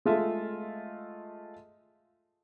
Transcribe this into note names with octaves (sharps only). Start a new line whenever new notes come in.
G#3 A3 F4 A4 E5